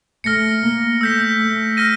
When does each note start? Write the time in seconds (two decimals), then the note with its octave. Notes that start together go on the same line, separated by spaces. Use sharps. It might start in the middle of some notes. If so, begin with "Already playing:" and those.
0.24 A3 F6 A#6 C#7
0.63 A#3
1.01 A3 E6 G6 B6
1.39 A3
1.77 F6 A#6 D#7